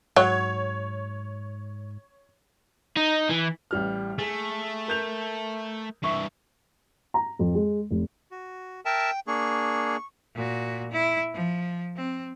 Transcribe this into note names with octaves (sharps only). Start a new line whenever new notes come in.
G#2 F#3 C#5 G#6
D#4
E3
A1 G3 F6
A3 G#4 B6
A#4 G6 F7
G2 E3 E5 C#6
A#5
F2
G#3
F1
F#4
A#4 E5 G5 A5
A#3 D4 G#4 C#6
A#2 F#4
E4
F3
C4